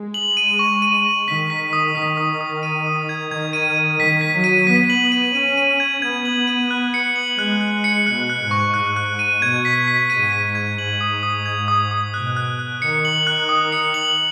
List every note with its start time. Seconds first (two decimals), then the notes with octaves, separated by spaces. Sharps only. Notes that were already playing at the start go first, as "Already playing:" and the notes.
Already playing: G#3
0.14 F#7
0.37 D#7
0.59 C#6
0.82 D#7
1.05 C#6
1.27 D#3 B6
1.50 B6
1.73 D#6
1.95 D#3 B6
2.18 D#6
2.41 D#6
2.63 D#7
2.86 D#6
3.09 G#6
3.31 D#3 G#6
3.53 D#7
3.76 D#7
3.99 D#3 B6
4.21 B6
4.33 F#3
4.44 D#7
4.67 B3 B6
4.90 F#7
5.12 D#7
5.34 C#4 D#7
5.57 D#7
5.80 G#6
6.02 B3 G#6
6.25 F#7
6.47 D#7
6.71 F#6
6.94 C#7
7.16 F#7
7.39 G#3 F#6
7.61 F#6
7.84 C#7
8.06 B2 F#6
8.30 F#6
8.40 G#2
8.51 C#6
8.74 G#2 F#6
8.96 F#6
9.19 D#7
9.42 B2 G#6
9.65 B6
9.88 B6
10.10 G#2 D#7
10.32 B6
10.55 G#6
10.78 G#2 F#7
11.01 D#6
11.23 D#6
11.46 G#6
11.68 D#6
11.91 D#6
12.14 B2 F#6
12.37 F#6
12.59 F#6
12.82 D#3 C#7
13.05 F#7
13.27 F#6
13.49 D#6
13.72 C#7
13.94 F#7